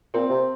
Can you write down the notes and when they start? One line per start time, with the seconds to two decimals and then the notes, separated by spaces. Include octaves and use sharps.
0.14 A#2 C4
0.30 C3